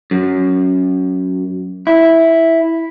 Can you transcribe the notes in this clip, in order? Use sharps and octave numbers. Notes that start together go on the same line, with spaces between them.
F#2
E4